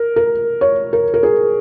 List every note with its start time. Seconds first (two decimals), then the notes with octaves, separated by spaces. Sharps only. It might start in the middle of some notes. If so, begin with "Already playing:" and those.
Already playing: A#4
0.16 A#4
0.61 C#5
0.93 A#4
1.14 A#4
1.23 G#4